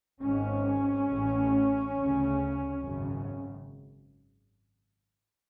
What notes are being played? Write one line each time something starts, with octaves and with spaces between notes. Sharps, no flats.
G#1 G#2 C#4
A1 A2
D2
C#3
G#1 F#2 C#3